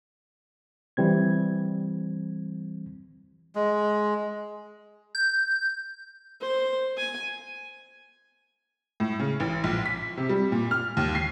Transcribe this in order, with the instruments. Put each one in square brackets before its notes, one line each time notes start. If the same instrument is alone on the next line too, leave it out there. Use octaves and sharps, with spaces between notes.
[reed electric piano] E3 G3 C4 G#6
[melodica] G#3
[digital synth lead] G6
[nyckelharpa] C5
G#5
[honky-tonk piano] A2
C#3
A1
A#1
B6
C3
G3
A#2
F6
D#2
C7